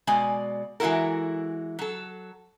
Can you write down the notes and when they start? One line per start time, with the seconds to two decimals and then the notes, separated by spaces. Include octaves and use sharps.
0.07 B2 G#3 D5 G#5
0.80 E3 G#3 E4 F#4 A4 A#4
1.79 F#3 A4